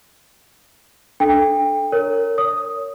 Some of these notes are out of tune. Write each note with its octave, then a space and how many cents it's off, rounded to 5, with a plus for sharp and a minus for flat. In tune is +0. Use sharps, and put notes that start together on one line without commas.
D4 +0 A4 -15 G5 +25
A#4 -20 C#5 +0
C#5 +20 D#6 +0